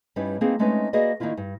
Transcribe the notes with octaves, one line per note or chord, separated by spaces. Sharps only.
G2 G3 C#4 D#4 E4 B4
A#3 C4 D#4 E4 G#4 B4
G#3 A3 C4 C#4 D#4 B4
A#3 F#4 G#4 B4 D5 D#5
D#3 A#3 D4 E4 F4
G2